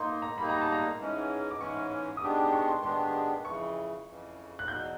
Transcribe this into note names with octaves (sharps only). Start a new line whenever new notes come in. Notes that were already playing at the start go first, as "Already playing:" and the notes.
Already playing: A#3 D#4 C6
A#5
G3 A#3 D#4 B5
A#5
A5
A#5
G#2 E3 G#3 C#4
D6
G#2 E3 G#3 C#4 C#6
D#6
D#3 G#3 B3 D4 G4 D6
D6
C#6
C6
D#3 G#3 B3 D4 G4 C6
F2 C#3 E3 C#6
F2 C#3 E3
F#6
E2 B2 F#3 G6